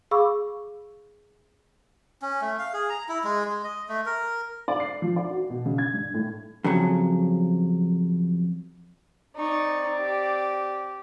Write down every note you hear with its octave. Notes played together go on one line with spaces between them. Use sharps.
G#4 F5 B5 C#6 D6 E6
C#4
A3
F5
G#4
A#5
E4
G#3
G#3
D#5
A3
A#4
D5
C7
F3
D5
F#4
B2
C#3
G#6
G2
A2
F2 C#3 F#3
C4 D#4 D5 C#6
G4